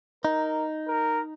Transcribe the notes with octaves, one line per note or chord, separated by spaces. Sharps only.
D#4 A#4
A#4